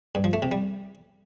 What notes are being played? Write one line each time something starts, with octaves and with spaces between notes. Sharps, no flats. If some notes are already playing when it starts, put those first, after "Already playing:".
G2
F3
A3
C3
G3